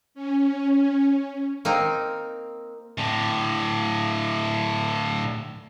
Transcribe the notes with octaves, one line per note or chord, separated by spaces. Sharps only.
C#4
A#3 C4 D#4
A2 D3